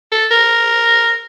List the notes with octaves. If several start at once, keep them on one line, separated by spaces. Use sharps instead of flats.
A4
A#4